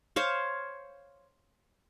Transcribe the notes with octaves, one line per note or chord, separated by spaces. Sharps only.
C5 C#5 F5